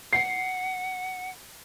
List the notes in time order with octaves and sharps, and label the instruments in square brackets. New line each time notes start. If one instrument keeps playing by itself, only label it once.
[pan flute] F#5 [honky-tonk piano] C7